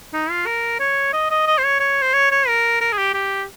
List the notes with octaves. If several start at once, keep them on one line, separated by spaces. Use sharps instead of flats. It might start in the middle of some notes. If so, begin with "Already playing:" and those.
D#4
F4
A#4
C#5
D#5
D#5
D#5
C5
C#5
C#5
C5
C#5
C#5
A#4
A#4
G#4
G4
G4